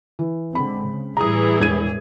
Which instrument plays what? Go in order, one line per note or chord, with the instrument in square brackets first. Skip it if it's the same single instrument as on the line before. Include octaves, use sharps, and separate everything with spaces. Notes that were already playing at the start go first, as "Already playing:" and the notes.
[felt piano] E3
[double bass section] D3 G#3 C4 [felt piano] B5
[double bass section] C#3
[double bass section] A2 G3 [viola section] E3 E4 G#4 [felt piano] A#5 D#6
[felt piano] E1 G#6 D#7